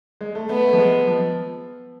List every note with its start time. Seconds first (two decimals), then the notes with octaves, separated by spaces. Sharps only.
0.21 G#3
0.35 A3
0.49 A3 B3
0.68 A3
0.73 F3
0.78 G#3
1.07 F3